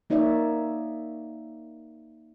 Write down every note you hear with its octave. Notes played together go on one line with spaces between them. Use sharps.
A#3 D#4 C#5 D5 E5